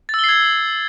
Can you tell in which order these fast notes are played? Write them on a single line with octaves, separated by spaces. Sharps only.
A6 E6 G7 C7 G#6